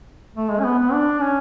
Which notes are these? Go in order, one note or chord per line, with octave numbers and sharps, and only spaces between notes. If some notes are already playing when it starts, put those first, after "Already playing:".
A3
G#3
C#4
B3
B3
D4
C#4